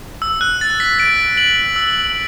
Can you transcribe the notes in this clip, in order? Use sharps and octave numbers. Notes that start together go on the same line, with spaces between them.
E6
F#6
A6
B6
A6 D7
D7 F#7
E6